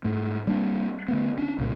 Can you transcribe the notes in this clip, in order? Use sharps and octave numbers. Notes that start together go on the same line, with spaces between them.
G#2 A3
G3 A#3 C4 D4
D3 A3 B3
C#4 D4
C2 A#2 C#3